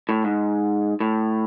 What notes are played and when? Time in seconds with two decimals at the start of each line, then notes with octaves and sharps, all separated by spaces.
0.09 A2
0.24 G#2
1.00 A2